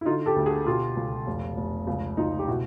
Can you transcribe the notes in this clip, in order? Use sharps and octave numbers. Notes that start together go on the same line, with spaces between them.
E4
D3 D#4 F4
G4 A4
D2
F#4 G#4
B2 F4 G4
C#2
F1
F1
C#2
C#2 D#4 F4
G4
B2 E4 F#4